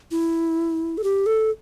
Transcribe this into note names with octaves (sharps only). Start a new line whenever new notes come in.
E4
A4
G4
A4